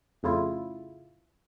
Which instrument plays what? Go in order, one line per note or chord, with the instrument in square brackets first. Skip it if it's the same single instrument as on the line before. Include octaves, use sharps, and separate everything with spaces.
[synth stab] F2 A2 C#3 E4 F4